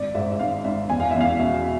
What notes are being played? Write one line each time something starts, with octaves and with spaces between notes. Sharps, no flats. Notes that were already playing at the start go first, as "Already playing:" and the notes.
Already playing: G#1 D5
G#2 E5
E5
G#1 F5
G#1 E5
E2 G#5
F5
E2 E5
F5
B2 E5